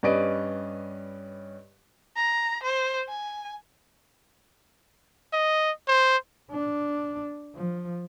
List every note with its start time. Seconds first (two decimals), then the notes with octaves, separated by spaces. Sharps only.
0.03 G2 C#4 B4 D5 D#5 D7
2.16 A#5
2.63 C5
3.09 G#5
5.33 D#5
5.88 C5
6.51 D4
7.55 F3